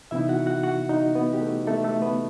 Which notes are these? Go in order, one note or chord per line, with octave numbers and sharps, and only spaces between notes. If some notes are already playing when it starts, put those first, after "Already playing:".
C3 E3 B3 D#4 E4 E5
F#4 F#5
F#4 F#5
F#4 F#5
D#4 D#5
B3 B4
G4
A3 A4
A3 A4
A3 A4
B3 B4